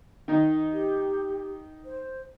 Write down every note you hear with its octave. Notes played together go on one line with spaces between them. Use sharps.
D#3 D#4
G4
C5